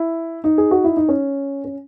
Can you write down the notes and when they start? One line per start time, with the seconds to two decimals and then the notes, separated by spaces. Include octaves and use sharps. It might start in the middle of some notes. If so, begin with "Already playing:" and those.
Already playing: E4
0.44 D#4
0.58 G#4
0.71 F#4
0.84 E4
0.97 D#4
1.09 C#4
1.65 C#4